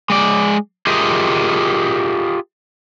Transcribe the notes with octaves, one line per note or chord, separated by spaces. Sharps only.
G#3 D5
F4 G4 G#4 A#4 D#5 E5